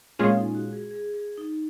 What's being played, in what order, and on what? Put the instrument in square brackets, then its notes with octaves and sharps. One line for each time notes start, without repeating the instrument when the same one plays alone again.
[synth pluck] A#2 G#3 C#4 F4 G#4 [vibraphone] C4
[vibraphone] D#4
F#4
G#4
G#4
G#4
D#4